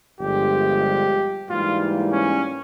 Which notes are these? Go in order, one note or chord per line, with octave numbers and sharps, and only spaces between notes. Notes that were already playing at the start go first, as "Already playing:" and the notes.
G1 G2 F3 G#3 G4
G#2 E3 G3 A#3 F4
C#4